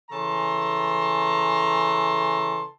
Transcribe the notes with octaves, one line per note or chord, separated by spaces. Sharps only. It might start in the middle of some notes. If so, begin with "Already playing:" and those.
C#3 E3 A4 A5 A#5 C6